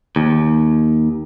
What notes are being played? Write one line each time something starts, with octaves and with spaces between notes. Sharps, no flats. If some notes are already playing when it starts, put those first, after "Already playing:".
D#2